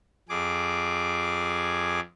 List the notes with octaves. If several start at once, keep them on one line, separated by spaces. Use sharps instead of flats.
F2 G#4 D6